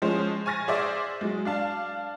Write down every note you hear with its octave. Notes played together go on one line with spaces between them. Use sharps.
F3 G#3 C#4 C5
G#5 C#6 F6 A6 A#6
G#4 C5 D5 E5
F#3 G#3
D4 F5 A5